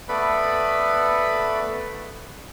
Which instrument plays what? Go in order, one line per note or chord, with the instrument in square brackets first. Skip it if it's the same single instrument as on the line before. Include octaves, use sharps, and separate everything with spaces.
[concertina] A3 B3 A4 B4 D5 B5